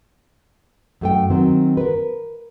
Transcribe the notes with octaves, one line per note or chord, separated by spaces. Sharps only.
F#2 A3 G5
D#3 F#3 C4
A#4 B4